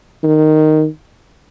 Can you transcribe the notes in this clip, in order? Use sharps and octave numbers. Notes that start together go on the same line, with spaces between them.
D#3